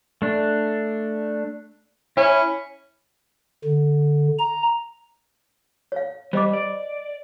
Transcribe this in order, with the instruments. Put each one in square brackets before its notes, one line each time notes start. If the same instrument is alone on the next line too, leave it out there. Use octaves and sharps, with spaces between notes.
[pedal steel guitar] A3 D4
[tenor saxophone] C#4 [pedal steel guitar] E4
[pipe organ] D3
A#5
[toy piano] C#5 F5
[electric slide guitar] G3 [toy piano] C5 D#5 D6
[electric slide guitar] D5